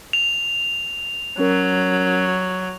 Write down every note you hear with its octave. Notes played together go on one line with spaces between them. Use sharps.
F7
F#3 C#4 A#4